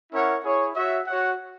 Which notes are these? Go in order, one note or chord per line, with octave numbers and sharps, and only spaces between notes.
C#4 E4 A#4 C#5 F#5
E4 G#4 C#5
F#4 C#5 E5
F#4 C#5 F#5